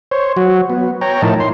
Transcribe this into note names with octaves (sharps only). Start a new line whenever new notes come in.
C5 C#5
F#3 F#4
B3
C#5 G5 A#5
A2 F3 D#4 E4 A#4 A5
C6